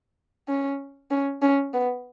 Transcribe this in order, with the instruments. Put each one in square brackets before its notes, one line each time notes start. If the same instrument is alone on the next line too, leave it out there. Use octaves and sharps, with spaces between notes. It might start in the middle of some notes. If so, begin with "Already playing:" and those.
[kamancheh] C#4
C#4
C#4
B3